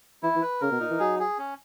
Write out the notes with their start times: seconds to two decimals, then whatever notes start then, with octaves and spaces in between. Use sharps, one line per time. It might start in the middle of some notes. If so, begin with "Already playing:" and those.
0.23 E3 E4
0.36 E3
0.42 B4
0.61 C#3 A#4
0.71 B2
0.80 A#2 D#4
0.90 E3
0.99 F#3 G#4
1.19 G#4
1.38 C#4